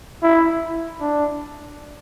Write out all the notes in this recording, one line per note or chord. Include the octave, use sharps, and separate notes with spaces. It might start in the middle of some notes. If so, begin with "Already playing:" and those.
E4
D4